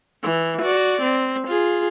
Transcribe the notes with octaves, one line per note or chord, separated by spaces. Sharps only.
E3
F#4 D5
C4
F4 G#4